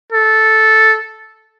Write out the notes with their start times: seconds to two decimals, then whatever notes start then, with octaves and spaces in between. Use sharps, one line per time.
0.12 A4